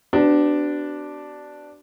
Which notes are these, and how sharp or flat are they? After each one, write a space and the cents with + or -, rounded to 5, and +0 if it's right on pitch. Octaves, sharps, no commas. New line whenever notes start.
B3 +35 D4 +0 F#4 +45